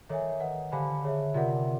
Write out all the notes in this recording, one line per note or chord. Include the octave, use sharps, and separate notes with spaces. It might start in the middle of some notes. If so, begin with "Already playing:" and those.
D#3 A4 C#5 E5 G#5
B4 D#5 F#5
D3 G4 C5 F5 G#5 B5
G#4 C#5 E5
C3 F4 A#4 D5 F#5